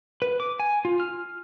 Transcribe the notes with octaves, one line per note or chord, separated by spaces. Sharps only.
B4
D6
G#5
F4
F6